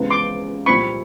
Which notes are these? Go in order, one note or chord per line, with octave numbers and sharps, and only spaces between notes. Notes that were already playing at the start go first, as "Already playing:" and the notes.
Already playing: C#2 C3 E3 G#3 B3
C6 D6
C2 A#2 G3 C4 E4 B5 C#6